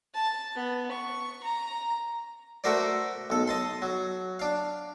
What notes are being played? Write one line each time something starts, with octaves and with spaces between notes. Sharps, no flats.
A5
B3
C#6
A#5
A3 F#4 A#4 C5 D5
B1 A4
D#5 A5 C6
F#3
D4 F5